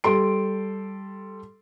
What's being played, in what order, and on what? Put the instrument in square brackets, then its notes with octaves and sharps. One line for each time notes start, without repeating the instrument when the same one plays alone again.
[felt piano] G3 A4 C6 D7